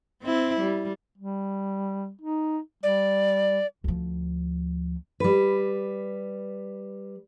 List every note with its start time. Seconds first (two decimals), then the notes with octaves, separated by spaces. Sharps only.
0.22 C4 E4
0.60 G3
1.18 G3
2.21 D#4
2.83 G3 D5
3.84 D2 F3
5.20 G3 B4